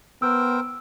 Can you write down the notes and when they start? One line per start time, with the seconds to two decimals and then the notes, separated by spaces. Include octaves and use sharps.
0.22 B3 A#4 C5 G5 E6